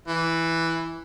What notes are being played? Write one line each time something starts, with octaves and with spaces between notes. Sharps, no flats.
E3